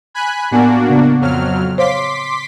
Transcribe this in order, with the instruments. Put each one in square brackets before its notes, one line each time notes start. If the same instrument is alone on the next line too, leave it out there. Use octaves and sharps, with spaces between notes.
[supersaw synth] G#5 B5 F#6
[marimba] A2 B3 G#5 [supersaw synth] A#3 D4 F#4
[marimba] C#3 B3
[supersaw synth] F2 F#3 F6
[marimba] C5 C#5 F5 [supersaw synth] C6 D6 B6